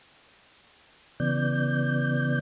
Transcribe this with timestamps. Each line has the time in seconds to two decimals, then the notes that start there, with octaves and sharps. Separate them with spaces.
1.20 C#3 E3 B3 D5 G6